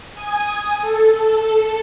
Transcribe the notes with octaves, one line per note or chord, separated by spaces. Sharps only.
G#5 D#6
A4